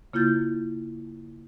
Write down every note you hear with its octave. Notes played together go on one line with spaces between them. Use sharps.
C#3 A#3 E4 F4 G6 A6